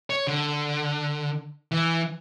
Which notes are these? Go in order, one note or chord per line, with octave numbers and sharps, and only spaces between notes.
C#5
D3
E3